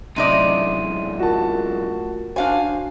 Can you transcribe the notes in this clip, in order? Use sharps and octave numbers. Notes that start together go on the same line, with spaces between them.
F#2 A2 C3 D#4 D5 E5 C6 D#7
F4 F#4 A#4 A5
D4 F#4 C5 F5 G#5